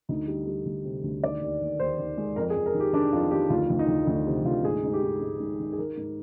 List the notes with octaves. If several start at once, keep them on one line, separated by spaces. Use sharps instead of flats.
D2 D#4
G3
G3
D2
C3
D2
D#3 D5
D#2
D#2
D#2 C5
D#3
G#3
F2 A#4
G#4
F2
A#4
D#3
G4
D#3 D4
F2 F4
D#3 G4
D2 F4
D2
D#4
D2
D2 D#4
C3
D2 F4
G#2 G#4
G#2
G4
G#2
G#2
G#2
D#3
G#4
D#3 A#4
G#2